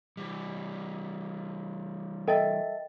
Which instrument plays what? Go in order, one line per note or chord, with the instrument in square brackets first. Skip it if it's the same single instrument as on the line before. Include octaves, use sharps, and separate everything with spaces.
[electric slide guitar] E3 G3
[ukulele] A4 E5 G5 [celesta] A#4 D#5 A6